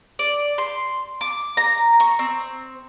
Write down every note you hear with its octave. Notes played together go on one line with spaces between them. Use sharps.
D5
C6
D6
A#5
C#6
C4